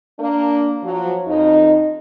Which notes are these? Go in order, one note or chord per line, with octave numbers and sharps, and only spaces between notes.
A#3 D4
F3 F#3
F2 D#4